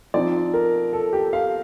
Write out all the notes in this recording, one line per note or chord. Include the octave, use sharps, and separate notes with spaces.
F3 C4 D#4 D5
A#4
A4
G4
F5